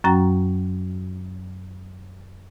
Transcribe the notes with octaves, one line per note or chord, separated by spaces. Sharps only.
F#2 F#3 C#4 F#4 G5 A#5